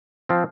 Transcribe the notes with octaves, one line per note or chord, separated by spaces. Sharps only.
F3 C4